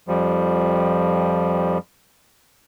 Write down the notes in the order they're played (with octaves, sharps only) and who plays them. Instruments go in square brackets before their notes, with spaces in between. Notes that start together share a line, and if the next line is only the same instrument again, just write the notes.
[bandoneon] F2 F3 G3